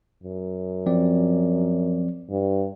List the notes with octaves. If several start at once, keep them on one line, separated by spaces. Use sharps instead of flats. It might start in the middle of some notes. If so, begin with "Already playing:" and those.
F#2
F3 C4 D5
G2